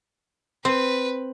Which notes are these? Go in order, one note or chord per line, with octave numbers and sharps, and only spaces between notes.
C4 B4